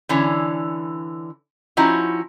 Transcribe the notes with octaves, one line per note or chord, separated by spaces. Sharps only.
D3 E3 C#4
F3 C#4 D#4 E4 F#4